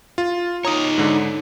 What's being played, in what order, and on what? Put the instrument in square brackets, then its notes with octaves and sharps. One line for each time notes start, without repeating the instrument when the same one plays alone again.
[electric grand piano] F4
[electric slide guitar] D#4 C#5 [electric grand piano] A#5 D#6
[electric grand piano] G#2 D3